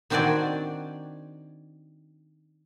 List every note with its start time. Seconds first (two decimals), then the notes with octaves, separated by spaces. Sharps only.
0.10 D#3 C4 D4 F#4 D5 G#5